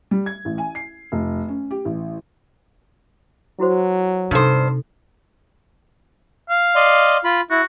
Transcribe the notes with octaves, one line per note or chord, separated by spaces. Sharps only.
G3
G#6
A1
G#5
C7
F1
C#4
G4
A1
F#3 E4 F#4 C5
G2 C3 D4 D#4 A4 C5
F5
D5 D#5 C6
F4 B5
E4 F#4